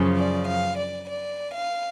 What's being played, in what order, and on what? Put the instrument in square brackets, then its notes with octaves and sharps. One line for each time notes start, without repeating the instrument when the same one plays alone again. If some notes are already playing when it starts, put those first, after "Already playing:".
Already playing: [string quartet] F#2 C#3 F3
D5
F5
D5
D5
F5